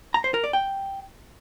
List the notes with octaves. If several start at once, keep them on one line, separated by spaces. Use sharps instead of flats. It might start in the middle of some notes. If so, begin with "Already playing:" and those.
A#5
C5
A#4
D5
G5